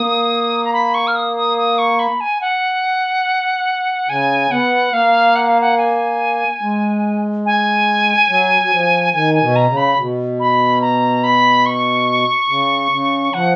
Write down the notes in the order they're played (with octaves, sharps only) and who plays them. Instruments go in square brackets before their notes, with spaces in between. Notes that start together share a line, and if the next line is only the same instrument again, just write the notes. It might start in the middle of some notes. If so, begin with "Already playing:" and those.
Already playing: [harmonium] A#3 [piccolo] D#6
[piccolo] A#5
B5
C#6
F6
D#6
D#6
D#6
C#6
B5
G#5
F#5
[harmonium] C#3 [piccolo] G#5
[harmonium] B3 [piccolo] F#5
[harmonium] A#3 [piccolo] F5
[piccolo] F#5
F5
F#5
G#5
[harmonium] G#3
[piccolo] G#5
[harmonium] F#3
F#3
F3
[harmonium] D#3 [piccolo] G#5
[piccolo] G#5
[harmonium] B2
[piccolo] A#5
[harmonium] C#3
[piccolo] B5
[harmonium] B2
[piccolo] B5
A#5
B5
C#6
[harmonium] C#3
C#3
[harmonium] F3 [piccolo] F#5